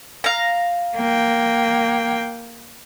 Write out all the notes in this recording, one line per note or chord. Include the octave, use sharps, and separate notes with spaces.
F5 A#5
A#3 G5